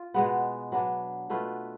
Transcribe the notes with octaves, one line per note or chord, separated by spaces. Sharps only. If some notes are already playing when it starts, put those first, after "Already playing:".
Already playing: F4
B2 G#3 B3
F#3 B3 D4
B2 A3 F4 B4